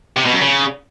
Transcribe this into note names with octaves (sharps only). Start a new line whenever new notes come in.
C3
B2
F#2
C#3